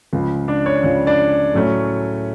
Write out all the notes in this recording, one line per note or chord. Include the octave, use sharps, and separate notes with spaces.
C#2 C#3 F3
D4 D5
C#5
C#2 C#3 F3 C#5
D4 D5
A2 F#3 A3 C#4